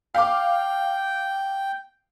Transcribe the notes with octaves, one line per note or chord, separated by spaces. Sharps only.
F5 G5 D6